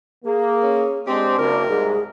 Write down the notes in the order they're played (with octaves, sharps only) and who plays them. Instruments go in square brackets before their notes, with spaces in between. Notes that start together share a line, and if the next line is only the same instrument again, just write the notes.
[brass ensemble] A#3 [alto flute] G#4
[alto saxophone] C#4
[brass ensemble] G#3 C4 [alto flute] D4 [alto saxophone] G4
[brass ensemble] F#1 [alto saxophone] A#4
[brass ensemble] C2 G#2 [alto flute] G#4